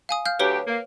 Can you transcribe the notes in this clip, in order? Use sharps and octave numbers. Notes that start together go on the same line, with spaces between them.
F5 G#5 D#6
F5 F6 G6
D2 F#3 G4 B4 C#5 G7
A#3